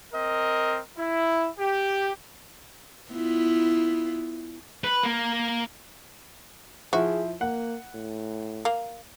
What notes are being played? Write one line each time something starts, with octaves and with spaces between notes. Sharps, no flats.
C4 A#4 D#5
E4
G4
B3 E4 F4
B4
A#3
F3 E4 F#4 G#4
A#3 F#5
A2
A#3